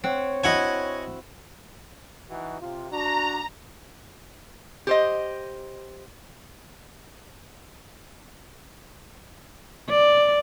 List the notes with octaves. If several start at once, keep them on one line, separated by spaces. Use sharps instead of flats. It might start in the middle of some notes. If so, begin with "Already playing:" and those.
C4 C#5 F#5
E4 F#4 D#5 F#5 G#5
E3 D#4 F#4
C3 F4
D4 F#4 A#5
G4 C5 D#5
D5